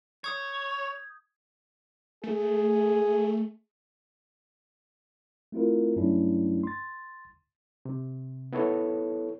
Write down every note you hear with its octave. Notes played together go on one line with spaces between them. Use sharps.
C#5 D#6 G6 G#6
A3 G#4
A3 C4 E4 F4 A#4
G2 F#3 A3 C#4 D4 E4
C6 A6
C3
B3 E4 A4 C#5